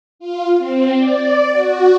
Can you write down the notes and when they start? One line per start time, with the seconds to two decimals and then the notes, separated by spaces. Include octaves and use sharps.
0.19 F4
0.58 C4
0.98 D5
1.52 F#4